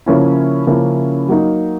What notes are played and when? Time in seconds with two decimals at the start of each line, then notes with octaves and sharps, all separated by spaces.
0.06 C#3 F3 A#3 C#4 E4
0.67 C#3 F3 A#3 C#4 E4
1.29 F#3 A#3 D#4